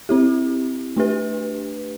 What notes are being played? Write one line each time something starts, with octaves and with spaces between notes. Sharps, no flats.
C4 E4 G4
A3 D4 G4 B4